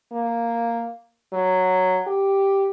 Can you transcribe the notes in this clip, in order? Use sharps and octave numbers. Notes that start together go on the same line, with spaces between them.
A#3
F#3
G4